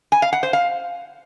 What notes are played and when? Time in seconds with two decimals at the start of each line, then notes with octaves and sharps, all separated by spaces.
0.12 G#5
0.22 F5
0.33 F#5
0.43 C5
0.53 F5